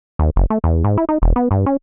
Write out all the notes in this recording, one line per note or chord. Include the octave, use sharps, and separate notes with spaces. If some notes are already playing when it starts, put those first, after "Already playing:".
D#2
F#1
A3
E2
G#2
E4
D#4
E1
B3
G2
C#4